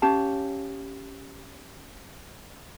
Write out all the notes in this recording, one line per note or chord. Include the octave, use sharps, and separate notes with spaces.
C#4 G4 F5 A5